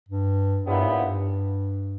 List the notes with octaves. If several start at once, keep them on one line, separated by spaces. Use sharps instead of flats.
G2
G2 A#2 F#3 B3 E4 G4
G#2
G2